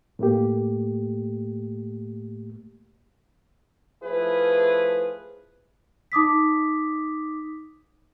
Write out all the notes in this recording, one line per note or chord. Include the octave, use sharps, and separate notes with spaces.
A2 A3 A#3 G4
F3 A3 E4 G#4 B4
D#4 D6 D#6 B6